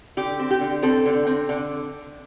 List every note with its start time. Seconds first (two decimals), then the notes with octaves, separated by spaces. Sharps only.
0.17 D3 G4
0.39 C4
0.51 G4
0.61 D3
0.82 C4 A4
1.05 D3
1.27 C4
1.49 D3